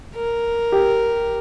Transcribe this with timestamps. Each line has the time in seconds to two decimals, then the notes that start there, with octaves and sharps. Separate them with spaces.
0.16 A#4
0.72 G4